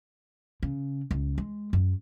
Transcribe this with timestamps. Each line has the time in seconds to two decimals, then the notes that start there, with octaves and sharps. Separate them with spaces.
0.63 C#3
1.11 C#2
1.38 G#3
1.73 F#2